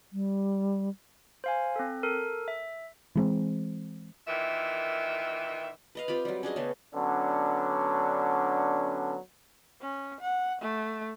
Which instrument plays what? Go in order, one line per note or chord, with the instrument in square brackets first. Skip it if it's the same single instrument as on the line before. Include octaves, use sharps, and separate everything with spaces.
[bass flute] G3
[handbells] C5 F5 G#5
C4 A4
A4 A#4
E5
[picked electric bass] E3 G#3 C4
[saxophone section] A#2 D#3 E3 E5
[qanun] B4 D#5 F5
C4 F4 G4 B5
F#3 G3
C#4 D4 G#4 D#5
C#3 A3 B3
[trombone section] D3 F#3 B3 C#4 D4
[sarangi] C#4
F#5
A3